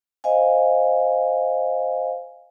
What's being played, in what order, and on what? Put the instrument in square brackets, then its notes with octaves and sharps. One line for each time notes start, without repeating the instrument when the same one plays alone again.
[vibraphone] C5 D#5 F5 G#5